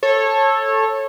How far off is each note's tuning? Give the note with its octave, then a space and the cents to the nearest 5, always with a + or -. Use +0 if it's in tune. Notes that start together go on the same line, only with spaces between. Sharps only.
A4 +0 C#5 -20